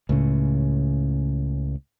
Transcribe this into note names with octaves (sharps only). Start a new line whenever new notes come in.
C#2 A2 C#3